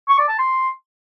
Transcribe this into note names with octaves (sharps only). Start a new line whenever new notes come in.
C#6
D5
A5
C6